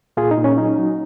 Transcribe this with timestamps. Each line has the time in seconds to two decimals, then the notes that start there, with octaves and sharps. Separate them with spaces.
0.17 A#2 F4 G#4
0.31 D#4
0.38 A#2
0.44 C#4
0.58 F#3 D#4
0.78 F#3